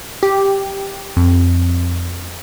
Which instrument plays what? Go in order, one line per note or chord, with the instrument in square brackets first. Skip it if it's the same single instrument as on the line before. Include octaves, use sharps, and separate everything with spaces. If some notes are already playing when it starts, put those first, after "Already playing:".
[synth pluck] G4
F2